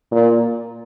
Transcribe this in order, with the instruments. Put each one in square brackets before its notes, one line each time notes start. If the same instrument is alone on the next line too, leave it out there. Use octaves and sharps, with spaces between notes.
[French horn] A#2